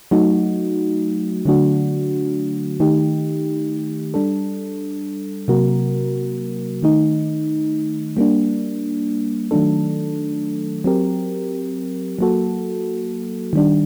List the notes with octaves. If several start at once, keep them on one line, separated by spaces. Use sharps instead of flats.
F#3 A3 D#4 F#4
D3 F#3 A3 D4 F#4
D#3 A3 D#4 G4
G3 D4 A4
C3 F#3 A#3 F#4 A#4
D#3 A3 D#4
G3 A#3 D4
D#3 F#3 A3 D4 A4
F#3 C4 G4 A#4
F#3 A#3 F#4 A4
D#3 G3 D4